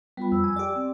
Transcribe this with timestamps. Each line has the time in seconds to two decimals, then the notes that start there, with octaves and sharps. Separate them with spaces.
0.17 G3 B3 F4 B5
0.32 F2 E6
0.44 G#5
0.56 G4 D5
0.76 C4